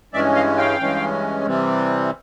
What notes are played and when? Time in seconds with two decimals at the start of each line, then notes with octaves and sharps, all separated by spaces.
0.13 G2 E3 G#3 C#4 D5 E5
0.35 D#5 F5
0.58 F5 G5
0.79 G2 E3 G#3 C#4
1.46 C3 E3 G3 C4